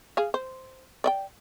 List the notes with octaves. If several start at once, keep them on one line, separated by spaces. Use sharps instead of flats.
G#4 F5
C5
D5 D#5 G5